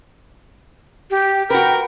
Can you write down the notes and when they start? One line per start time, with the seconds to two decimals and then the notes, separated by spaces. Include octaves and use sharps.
1.11 G4
1.50 F#4 A#4 B4 G5